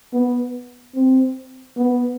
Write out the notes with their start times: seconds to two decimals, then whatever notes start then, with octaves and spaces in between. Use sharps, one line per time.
0.13 B3
0.95 C4
1.77 B3